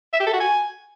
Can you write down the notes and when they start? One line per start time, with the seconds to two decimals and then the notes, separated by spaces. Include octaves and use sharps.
0.13 E5
0.20 G4
0.27 A4
0.33 F#4
0.40 G#5